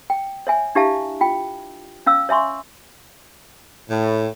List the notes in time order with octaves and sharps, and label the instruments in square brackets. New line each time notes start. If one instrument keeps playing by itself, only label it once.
[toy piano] G5
C#5 E5 G#5
D4 E4 G4 E5 F5 A5
F4 G5
C#4 F5 E6
C#5 E5 G#5 C6 C#6
[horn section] A2